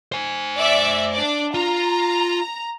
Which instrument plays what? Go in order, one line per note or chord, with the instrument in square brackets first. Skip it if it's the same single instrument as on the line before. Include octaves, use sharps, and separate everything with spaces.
[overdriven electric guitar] C5 G#5
[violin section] D5 E5
D4 D5
[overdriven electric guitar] F4 [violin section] A#5